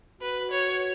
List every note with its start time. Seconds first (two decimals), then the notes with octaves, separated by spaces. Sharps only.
0.21 F#4 B4
0.51 C#5